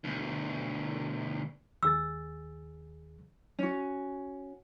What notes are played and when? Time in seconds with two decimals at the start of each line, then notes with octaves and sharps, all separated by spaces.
0.04 D2 B2
1.83 D#2 G#4 E6 A6
3.59 C#4 F#4